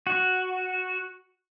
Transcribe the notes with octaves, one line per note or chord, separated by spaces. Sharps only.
F#4